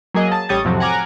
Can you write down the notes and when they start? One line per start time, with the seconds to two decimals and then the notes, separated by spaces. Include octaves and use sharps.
0.14 F#3 A#3 G#4 D#5
0.32 A5
0.49 A1 G3 C#5 D#6 G6 A6
0.65 F2 A2 C3 F3 F#3 C4
0.80 F#5 G#5 A#5 D6 F6 G#6